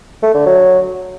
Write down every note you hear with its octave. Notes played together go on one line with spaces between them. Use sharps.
A3
D3
F#3